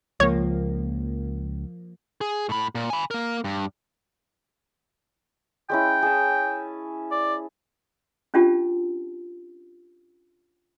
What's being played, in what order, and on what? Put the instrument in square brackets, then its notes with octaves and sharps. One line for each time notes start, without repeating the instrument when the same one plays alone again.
[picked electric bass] C#2 [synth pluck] F3 A#3 [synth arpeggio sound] C#5
[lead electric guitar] G#4
A2 B5
A#2
G#5 B5
A#3 A#4
G2
[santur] G#3 C#4 E4 [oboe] G5
[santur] G#4 A5
[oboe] D5
[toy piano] C#4 D4 F4 G4 A5